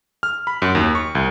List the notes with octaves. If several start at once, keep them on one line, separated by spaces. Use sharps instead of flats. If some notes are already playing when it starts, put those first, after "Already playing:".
F6
B5
F#2
D#2
C#6
C2